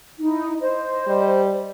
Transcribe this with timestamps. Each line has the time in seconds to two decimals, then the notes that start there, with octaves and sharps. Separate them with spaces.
0.19 D#4 E4
0.60 C5 D#5
1.07 G3